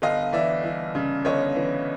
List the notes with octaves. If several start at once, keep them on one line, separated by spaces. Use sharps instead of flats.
G1 D#5 F5
E3 D5 E5
E3
C#3
G1 C#5 D#5
E3